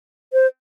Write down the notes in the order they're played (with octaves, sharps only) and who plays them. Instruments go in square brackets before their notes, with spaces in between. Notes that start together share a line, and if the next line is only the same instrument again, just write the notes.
[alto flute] C5